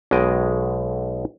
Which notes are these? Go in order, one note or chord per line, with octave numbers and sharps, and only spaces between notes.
B1 B2 G#3 D#5 G5